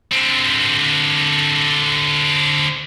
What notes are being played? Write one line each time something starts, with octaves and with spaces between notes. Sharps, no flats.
D3 C4